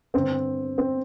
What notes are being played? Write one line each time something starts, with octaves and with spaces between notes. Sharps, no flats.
G2 D3 C4
C4